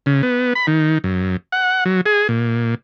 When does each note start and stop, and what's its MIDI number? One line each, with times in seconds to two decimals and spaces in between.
0.06 0.22 49
0.23 0.53 59
0.55 0.66 83
0.67 0.98 51
1.04 1.37 42
1.52 1.84 78
1.85 2.01 54
2.06 2.28 68
2.29 2.75 46